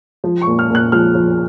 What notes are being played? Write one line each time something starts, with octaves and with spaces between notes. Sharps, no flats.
F3
C#6
A#2
F6
A#2 F#6
F3 F6
F3